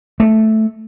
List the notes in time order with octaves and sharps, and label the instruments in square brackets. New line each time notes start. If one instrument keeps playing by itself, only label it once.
[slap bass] A3